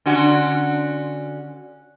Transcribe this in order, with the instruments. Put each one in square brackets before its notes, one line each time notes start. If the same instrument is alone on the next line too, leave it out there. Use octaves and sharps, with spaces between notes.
[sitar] D3 C#4 F#4